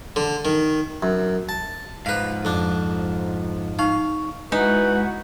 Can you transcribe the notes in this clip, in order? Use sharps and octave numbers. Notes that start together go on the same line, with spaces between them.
D3
D#3
F#2
A5
G#2 F3 B4 F5
F2 D4
D#4 F5 C#6
G#3 D#4 E4 F#4 B4